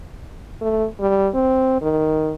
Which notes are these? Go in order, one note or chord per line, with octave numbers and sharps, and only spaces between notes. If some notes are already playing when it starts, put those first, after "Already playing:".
A3
G3
C4
D#3